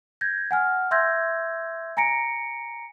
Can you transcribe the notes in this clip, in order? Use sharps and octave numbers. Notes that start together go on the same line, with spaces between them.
G6 G#6 A#6
F#5 G#5 F6
E5 C6 E6 G6 G#6 A#6
G#5 A#5 A#6 C#7 D7